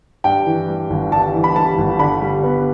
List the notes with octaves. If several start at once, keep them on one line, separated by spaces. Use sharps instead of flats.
G2 G5
E3
G3
G1
G2 A5
E3
B5
G3 A5
G1
D3 B5
G3
B3